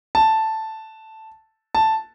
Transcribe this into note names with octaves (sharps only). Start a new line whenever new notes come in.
A5
A5